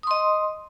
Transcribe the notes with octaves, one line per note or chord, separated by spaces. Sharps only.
D#5 C6 D#6